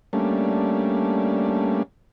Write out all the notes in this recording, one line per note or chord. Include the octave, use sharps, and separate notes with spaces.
G3 A3 A#3 C#4 D4